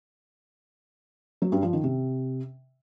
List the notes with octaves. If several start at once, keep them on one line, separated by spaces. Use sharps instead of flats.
F#3
G2
F3
D#3
C3